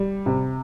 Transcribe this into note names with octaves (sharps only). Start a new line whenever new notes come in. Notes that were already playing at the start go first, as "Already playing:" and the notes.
Already playing: G3
C3